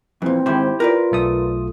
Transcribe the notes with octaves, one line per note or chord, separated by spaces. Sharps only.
F2 A#2 E3 C4
G#2 D#3 E4 G4 C5
F4 A#4 B4 D5
B1 A3 D#6